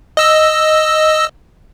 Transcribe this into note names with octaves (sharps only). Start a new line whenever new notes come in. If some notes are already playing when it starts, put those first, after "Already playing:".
D#5 E6